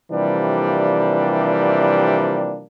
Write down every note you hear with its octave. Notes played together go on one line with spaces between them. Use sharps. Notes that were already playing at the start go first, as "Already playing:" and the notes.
C3 E3 F3 G3 A#3 D4